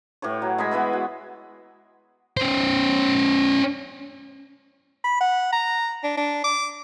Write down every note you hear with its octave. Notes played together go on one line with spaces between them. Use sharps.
A2 G4 B4 C#5
F#3
G#3 D#5 G#5 B5
E3 B3 B4 E5
F#4
C#4 C5
B5
F#5
A#5
D4
D4
D6